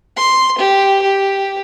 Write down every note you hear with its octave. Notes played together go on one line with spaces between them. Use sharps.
C6
G4
G4